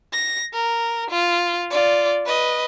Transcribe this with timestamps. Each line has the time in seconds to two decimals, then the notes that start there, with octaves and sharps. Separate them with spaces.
0.12 A#6
0.53 A#4
1.10 F4
1.70 F4 D5
2.25 B4 D#5